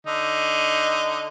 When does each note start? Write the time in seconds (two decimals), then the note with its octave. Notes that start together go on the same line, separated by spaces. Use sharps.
0.07 D3 D#4